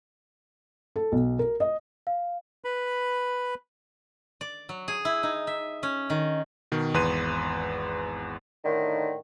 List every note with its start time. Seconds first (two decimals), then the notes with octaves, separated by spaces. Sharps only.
0.96 A4
1.12 B1
1.39 A#4
1.60 D#5
2.07 F5
2.65 B4 B5
4.41 D5
4.69 F#3
4.88 G#4
5.05 E4
5.23 D#4
5.47 E5
5.83 C#4
6.10 D#3
6.72 B2 D#3
6.94 G#1 E2 B4 C6 F#6 D#7
8.65 A2 D3 D#3